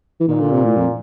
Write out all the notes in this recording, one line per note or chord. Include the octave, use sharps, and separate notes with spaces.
E3
A#2 D#3
D3
C3
A2
F2